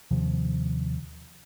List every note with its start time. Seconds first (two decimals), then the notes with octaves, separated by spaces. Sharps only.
0.11 D#2 C3 F3